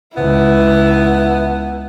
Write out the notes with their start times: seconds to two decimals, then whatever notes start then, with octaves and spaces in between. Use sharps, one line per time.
0.17 C#2 B3 E4